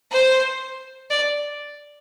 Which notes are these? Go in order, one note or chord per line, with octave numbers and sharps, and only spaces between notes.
C5
D5